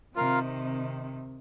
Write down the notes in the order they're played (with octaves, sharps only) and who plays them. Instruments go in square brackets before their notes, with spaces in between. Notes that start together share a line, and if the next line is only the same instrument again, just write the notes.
[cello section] C3 D#3 [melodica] F4 A#4 F5